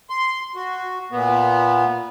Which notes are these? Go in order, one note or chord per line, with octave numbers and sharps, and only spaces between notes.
C6
F#4
A#2 B3